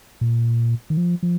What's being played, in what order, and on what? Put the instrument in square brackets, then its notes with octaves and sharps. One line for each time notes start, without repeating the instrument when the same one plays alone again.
[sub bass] A#2
D#3
F3
F3